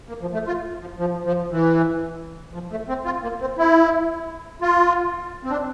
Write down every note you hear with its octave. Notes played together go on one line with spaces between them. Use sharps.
A#3
F3
A3
F4
F3
F3
F3
E3
F3
A3
C4
F4
A#3
C4
E4
F4
C4
D4